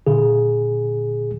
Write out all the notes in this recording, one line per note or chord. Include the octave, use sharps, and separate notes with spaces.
A#2 D3 G#4